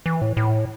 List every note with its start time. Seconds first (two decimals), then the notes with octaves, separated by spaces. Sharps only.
0.06 E3
0.22 A2
0.37 A2